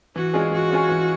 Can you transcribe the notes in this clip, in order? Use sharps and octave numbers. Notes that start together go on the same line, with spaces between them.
E3 F#4
G#3 C#4 F4 G#4
E3 F#4
G#3 C#4 F4 G#4
E3